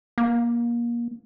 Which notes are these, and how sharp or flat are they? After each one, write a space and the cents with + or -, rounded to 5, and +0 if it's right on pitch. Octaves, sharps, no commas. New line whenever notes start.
A#3 +25